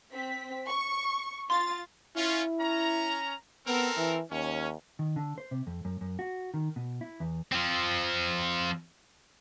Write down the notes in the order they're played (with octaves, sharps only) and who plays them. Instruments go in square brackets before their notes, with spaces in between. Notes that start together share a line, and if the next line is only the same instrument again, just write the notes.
[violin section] C4 B6
C#6
[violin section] F4 A6 [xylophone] C6
[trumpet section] C#4 F4 [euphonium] E4
[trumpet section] C#4 A#5
[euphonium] B3 [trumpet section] C4 A4 A#4
[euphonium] E3
[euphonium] D#2 [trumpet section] C#4
[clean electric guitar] D#3
D3
C5
C3
F2
F#2
F#2
F#4
D#3
B2
E4
E2
[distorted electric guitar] F3 C4